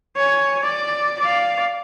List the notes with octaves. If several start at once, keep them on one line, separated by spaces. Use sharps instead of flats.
C#5 G#5
D5
D5 F5